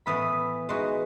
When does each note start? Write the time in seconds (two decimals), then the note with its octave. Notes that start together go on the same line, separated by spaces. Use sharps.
0.06 A2 E3 B3 E4 B5 D#6
0.69 E3 G#3 D#4 F#4